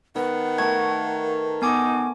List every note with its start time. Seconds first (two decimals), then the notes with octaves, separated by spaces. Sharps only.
0.16 D#3 B3 F#5
0.58 A3 A#4 G#6
1.62 B3 D#4 G#5 D6